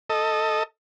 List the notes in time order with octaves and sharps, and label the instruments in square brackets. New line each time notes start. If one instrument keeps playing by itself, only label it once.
[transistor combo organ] A4 D#5